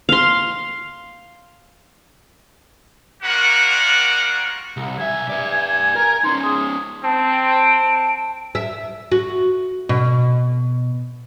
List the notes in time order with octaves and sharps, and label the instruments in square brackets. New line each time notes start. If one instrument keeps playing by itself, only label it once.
[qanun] F5 C6
[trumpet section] G3 A#3 F4 F#4 A#4 F#5
[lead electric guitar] C2
[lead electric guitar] B1 E5 [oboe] G#5
[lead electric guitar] B4 D5
A#4 A#5
[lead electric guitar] C#4 D#4 [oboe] C6
[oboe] G#4
[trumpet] C4 [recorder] A5
[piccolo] D7
[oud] E5
F#4
B2